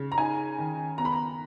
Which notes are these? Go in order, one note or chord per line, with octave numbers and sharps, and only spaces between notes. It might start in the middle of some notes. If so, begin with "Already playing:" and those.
Already playing: C#3
A#5
D#4 G#5
D#3
B3 A#5
B5
A#5